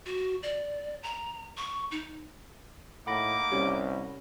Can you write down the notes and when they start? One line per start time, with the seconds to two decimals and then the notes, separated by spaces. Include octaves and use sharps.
0.06 F#4
0.43 D5
1.03 A#5
1.57 C#6
1.91 D#4
3.07 A2 A#3 D#4 F#5 B5 D6 A#6
3.51 C2 G3 C#4